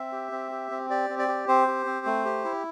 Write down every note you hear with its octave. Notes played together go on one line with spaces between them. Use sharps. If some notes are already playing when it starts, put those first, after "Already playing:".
Already playing: C4 E5
G4
C4
G4
C4
G4 D5
C4
D5
G4
C4 C5
G4
C4
A3
G4
E4